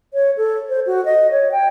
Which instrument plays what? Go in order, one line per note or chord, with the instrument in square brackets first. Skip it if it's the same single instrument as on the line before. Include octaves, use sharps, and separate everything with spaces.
[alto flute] C#5
A4
C5
F#4
D#5
C#5
G5